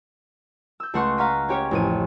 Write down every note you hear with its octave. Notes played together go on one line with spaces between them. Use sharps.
E6 G6
C#2 A3 F4 F#5 C6 C#6
F5 F#5 A#5 C#6 B6 D#7
C#4 G4 C#5
A1 F2 D#7